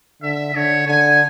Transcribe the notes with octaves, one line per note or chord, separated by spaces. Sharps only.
D3 E5
D3 C#5
D3 G#5